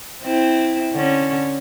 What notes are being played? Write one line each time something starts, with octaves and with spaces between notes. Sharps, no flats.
C4 E4
D3 C#4